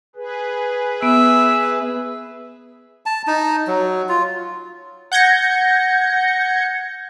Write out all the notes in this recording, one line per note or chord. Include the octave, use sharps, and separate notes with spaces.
G#4 B4
B3 E5
A5
D#4
F#3
F4
F#5 G6 G#6 A#6 C#7